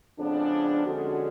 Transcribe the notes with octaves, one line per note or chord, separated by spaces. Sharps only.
F2 C#3 G#3 B3 D4
D3 F3 G#3 C#4 F#4